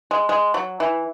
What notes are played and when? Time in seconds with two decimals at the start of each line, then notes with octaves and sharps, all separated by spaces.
0.11 G#3
0.29 G#3
0.54 F#3
0.80 E3